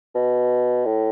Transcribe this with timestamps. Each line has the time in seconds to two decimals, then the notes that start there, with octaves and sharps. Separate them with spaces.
0.15 B2
0.85 A2